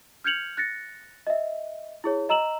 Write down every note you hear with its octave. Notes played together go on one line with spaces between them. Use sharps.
F6 G6 G#6 C#7 F7 F#7
F#6 A6 A#6 C#7
D#5 E5
E4 G#4 C#5
D#5 A#5 E6 E7 F#7